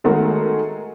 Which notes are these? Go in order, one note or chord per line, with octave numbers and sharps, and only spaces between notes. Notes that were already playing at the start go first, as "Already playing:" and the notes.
D#3 G#3 A3 F#4 G#4 A#4